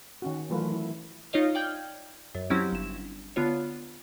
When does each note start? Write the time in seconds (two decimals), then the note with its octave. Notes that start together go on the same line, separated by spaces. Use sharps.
0.22 D#3 C#4 F#4
0.50 E3 F#3 A3 F4 A#4 B4
0.72 E4
1.33 D#4 F4 C#5 D#5 F5
1.55 D5 G5 F6 G6 G#6
2.35 F#2
2.50 F#3 C4 C#4 E4 G4
2.72 G1 E7
3.36 D3 B3 F4 C#5